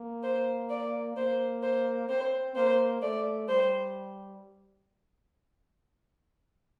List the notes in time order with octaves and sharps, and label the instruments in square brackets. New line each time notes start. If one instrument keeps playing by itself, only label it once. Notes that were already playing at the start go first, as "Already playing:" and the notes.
Already playing: [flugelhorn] A#3
[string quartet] C5
D5
[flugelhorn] A#3 [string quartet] C5
[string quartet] C5
[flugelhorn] C4 [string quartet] C5
[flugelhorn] A#3 [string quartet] C5
[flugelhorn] A3 [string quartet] D5
[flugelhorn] G3 [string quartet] C5